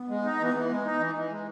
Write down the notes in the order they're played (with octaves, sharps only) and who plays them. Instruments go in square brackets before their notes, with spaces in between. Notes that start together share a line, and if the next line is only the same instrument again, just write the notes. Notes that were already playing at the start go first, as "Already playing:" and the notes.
Already playing: [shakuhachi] B3
[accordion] G#3
D#4
E3
E3
G#3
D#4
E3
E3
G#3